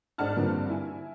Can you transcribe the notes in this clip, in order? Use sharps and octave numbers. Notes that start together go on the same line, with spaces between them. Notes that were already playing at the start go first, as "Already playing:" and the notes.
G#1 D4 D#5 F#5 A5 F6
G2 D3 F3 A#3 C4
E4 G#5